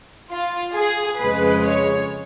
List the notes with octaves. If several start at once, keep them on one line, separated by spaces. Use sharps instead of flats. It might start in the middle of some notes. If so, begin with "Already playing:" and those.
F4
G#4
F2 C#3 G#3 B4
C#5